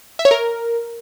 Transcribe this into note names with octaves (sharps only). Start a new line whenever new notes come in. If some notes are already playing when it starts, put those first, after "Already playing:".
E5
C#5
A#4